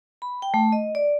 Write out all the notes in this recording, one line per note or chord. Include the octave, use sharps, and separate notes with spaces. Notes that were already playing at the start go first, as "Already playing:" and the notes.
B5
G5
A3
D#5
D5